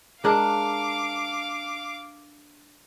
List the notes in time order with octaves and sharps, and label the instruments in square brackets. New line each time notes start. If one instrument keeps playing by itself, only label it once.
[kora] G#3 D4 A#4 [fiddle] F5 D6